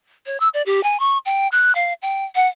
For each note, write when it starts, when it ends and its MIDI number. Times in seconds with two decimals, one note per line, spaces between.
0.26 0.39 73
0.40 0.49 88
0.54 0.62 74
0.66 0.83 67
0.83 0.99 80
1.00 1.18 85
1.26 1.48 79
1.52 1.74 90
1.75 1.93 77
2.02 2.25 79
2.35 2.47 78